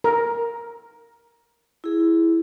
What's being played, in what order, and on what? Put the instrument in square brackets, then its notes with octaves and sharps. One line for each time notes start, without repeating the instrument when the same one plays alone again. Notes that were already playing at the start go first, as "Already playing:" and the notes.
[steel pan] A#4
[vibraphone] E4 G#4